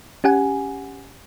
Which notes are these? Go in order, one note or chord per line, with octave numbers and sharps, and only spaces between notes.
C#4 G4 F#5 G#5